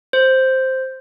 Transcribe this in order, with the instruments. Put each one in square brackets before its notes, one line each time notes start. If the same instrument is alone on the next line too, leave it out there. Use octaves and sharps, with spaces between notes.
[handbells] C5